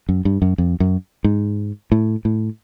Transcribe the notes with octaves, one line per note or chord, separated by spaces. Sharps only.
F#2
G2
F#2
F2
F#2
G#2
A2
A2